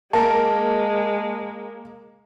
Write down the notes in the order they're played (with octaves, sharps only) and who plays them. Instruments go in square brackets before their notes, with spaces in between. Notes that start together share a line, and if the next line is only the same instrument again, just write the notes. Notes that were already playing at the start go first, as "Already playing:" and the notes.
[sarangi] G#3 [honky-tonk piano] A#3 A#4 [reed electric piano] A5